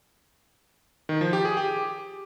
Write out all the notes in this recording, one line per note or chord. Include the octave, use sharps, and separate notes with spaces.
D#3
F3
G4
G#4
G4